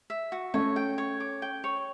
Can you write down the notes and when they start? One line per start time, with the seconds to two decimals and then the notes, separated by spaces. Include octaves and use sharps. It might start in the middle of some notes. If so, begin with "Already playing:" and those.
0.10 E5
0.32 F#4
0.54 A3 C#4 C#5
0.76 G5
0.98 C#5
1.20 D6
1.42 G5
1.64 C#5